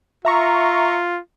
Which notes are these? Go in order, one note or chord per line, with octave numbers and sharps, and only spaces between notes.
F4 E5 A#5 C#6